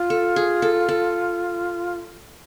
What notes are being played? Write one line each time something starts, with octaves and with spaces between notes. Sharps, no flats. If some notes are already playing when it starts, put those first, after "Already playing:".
Already playing: F4
A4
G#4
A4
A4